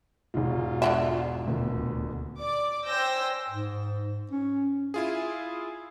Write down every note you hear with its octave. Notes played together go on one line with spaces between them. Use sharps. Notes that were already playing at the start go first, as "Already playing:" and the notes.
E1 G#2 F4
D3 A#3 E5
D#1 D2 B2
D5 D6
C5 G5 G#5 E6 G6 A#6
G#2
C#4
E4 F4 G#4